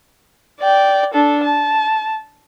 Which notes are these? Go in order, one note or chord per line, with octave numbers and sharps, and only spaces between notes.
D5 G5
D4 A4
A5